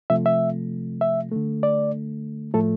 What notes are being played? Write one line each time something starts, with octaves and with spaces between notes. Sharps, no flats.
C3 F3 A3 E5
E5
E5
D3 A3
D5
A2 F3 A3 A4